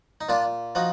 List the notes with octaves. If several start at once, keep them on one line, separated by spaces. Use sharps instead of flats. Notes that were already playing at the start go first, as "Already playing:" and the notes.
D#4
A#2 D4 F4
F3 D#4 F#4